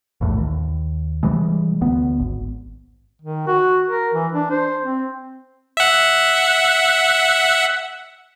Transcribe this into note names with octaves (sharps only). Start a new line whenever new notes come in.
A#1 E2 A2
D#2
C3 E3 G3 G#3
D2 B3
G#1
D#3
F#4
A#4
E3
D4
C5
C4
E5 F#5